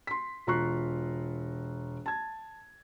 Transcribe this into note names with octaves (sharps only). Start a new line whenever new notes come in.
C6 B6
E1 F4 A#5 C#6 F#6 C7
A5 G#6